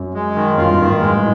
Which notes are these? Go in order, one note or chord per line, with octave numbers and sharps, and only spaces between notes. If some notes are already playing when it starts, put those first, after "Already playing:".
Already playing: F#2
G#3
D#3
F#2 F4
G2
F#2
D#3
G#2
G#3
A2